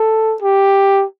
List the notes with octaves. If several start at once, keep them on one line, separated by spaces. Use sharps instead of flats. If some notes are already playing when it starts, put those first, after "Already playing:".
Already playing: A4
G4